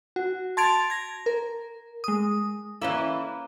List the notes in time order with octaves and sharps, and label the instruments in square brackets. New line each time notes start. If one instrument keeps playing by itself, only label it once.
[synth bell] F#4
A5 C6 G#6 A6 D7 F7
G#6 A#6
A#4
G#3 D#6
[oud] E3 C#4 E4 [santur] A#3